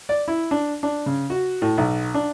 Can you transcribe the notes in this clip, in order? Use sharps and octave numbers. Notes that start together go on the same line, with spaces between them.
D5
E4
D4
D4
C#3
F#4
A2
B1
D4